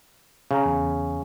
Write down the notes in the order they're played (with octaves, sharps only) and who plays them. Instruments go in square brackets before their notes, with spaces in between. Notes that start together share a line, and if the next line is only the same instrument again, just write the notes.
[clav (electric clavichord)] C#3 [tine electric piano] F5 A#5
[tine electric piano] E2